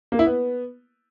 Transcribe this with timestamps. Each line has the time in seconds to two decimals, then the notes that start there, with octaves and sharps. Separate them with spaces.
0.12 A#3
0.19 E4
0.26 B3